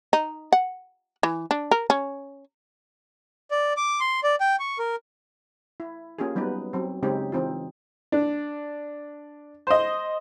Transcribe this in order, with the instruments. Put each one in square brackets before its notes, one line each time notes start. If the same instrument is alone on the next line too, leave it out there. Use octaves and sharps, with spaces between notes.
[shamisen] D#4
F#5
E3
D4
A#4
C#4
[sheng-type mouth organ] D5
D6
C6
D5
G5
C#6
A#4
[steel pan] E4
A#3 C#4 F4 G4 G#4
F#3 G3 B3 D#4 B4
F#3 C4
C#3 G#3 C4 C#4 D#4 G4
E3 C4 D#4 F4
[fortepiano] D4
C5 D#5